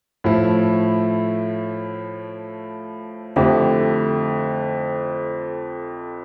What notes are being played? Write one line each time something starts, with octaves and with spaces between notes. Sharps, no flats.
A2 F3 A3 E4
F2 D3 A3 E4 G4